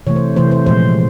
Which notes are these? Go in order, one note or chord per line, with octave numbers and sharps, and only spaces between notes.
C3 E3 A3 C#5
C5
C3 E3 A3 C5
C5
A#2 F3 G#3 C5